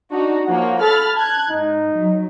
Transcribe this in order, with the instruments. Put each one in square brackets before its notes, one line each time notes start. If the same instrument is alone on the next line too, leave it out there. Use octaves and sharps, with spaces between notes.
[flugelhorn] D4 [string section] D#4 F#4
[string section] F3 A#3 C#5 [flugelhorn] F#5
[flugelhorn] A4 [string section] B5 F6 A6
[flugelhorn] A5 [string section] F#6 G#6
[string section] G#2 [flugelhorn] D#4
[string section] F#3